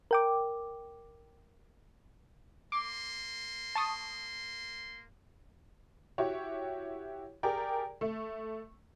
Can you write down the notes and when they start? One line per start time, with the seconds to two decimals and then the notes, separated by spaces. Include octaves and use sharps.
0.11 A#4 G5 D6
2.72 A#3 C6 D6
3.75 A5 C#6 D#6
6.18 E4 F#4 G4 C#5
7.43 G4 G#4 A#4 D5 G5
8.01 A3